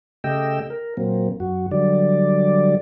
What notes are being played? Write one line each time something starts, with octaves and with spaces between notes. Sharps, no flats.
C#3 A3 G4 D#5 G5 E6
A#4
A#2 F#3 A#3 C4
F#2 F#4
D3 F#3 G3 D5